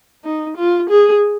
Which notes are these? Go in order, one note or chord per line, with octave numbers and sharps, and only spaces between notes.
D#4
F4
G#4